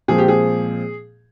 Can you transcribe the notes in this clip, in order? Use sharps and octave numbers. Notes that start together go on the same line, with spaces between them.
A#2 F3 G#3 C4 G#4
G4
G#4